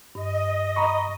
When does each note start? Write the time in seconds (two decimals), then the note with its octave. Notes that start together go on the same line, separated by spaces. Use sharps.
0.15 G2 D#5
0.76 A#5 B5 C#6